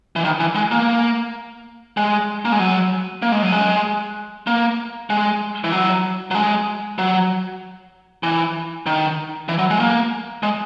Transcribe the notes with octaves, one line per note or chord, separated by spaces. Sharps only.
E3
D#3
E3
G#3
A#3
G#3
A#3
G#3
F#3
A#3
G#3
F#3
G#3
A#3
G#3
E3
F#3
F#3
G#3
F#3
E3
D#3
E3
F#3
G#3
A#3
G#3